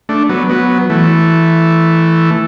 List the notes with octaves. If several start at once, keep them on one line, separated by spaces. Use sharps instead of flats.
A3 D4
F#3 B3
F#3 B3
E3 A3